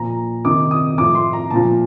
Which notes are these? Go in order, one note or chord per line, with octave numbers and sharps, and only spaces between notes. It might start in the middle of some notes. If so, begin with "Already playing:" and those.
Already playing: A#2 F3 A#5
C3 D#3 D6
D#6
A2 F3 D6
C6
A#5
A#2 F3 A5